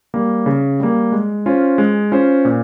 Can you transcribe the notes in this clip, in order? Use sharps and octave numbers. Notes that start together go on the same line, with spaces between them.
G3 A#3
C#3
G3 A#3
G#3
C#4 F4 C5
G#3
C#4 F4 C5
A#2